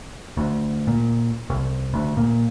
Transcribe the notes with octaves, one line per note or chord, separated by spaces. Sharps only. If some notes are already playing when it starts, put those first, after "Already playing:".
D2
A#2
C2
D2
A#2